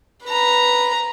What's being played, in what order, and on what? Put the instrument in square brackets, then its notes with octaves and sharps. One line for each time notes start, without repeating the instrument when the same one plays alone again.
[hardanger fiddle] B4 A#5